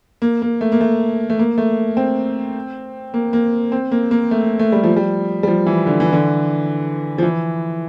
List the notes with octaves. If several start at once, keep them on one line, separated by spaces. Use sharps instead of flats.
A#3
A#3
A3
A#3
A3
A3
A#3
A3
C4
A#3
A#3
C4
A#3
A#3
A3
A3
G3
F3
G3
G3
F3
E3
D3
E3
D3
F3
E3